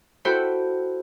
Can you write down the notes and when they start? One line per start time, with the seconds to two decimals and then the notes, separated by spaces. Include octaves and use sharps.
0.25 E4 F#4 A4 C5 G5 B5